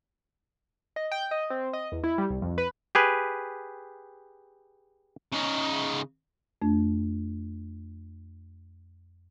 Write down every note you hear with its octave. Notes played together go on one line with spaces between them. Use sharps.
D#5
G5
D#5
C4
D#5
E2
E4
G3
C2
F2
B4
G4 G#4 B4
C#3 D#4
F2 A3 D4